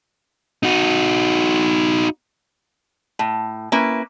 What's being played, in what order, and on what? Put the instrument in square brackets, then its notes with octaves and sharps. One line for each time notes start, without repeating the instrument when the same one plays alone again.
[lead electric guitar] D#4 F#4
[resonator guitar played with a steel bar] A2
A#3 C#4 E4 B4